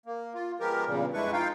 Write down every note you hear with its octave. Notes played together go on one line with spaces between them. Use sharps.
A#3
F4
F3 G#3 B3 G4 A#4
E2 G2 A#2 C#3 G3
F2 G#3 D4 E4 B4 C#6
D#4 F4 F5 G5